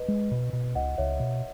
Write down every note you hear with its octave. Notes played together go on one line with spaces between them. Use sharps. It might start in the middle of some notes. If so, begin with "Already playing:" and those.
Already playing: B4 D#5
G#3
B2
B2
C#2 D#5 F#5
C#2 C#5 E5
B2